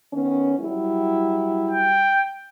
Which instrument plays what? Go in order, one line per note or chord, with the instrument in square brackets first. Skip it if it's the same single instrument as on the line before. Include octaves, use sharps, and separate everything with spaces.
[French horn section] D#3 B3 C#4
F#3 G3 E4
[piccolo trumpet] G5